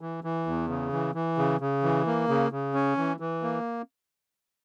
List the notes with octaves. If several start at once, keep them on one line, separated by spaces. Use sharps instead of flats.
E3
E3
E2
C#3
E3
E3
C#3
C#3
E3
A#3
C#3
C#3
C#4
E3
E3
A#3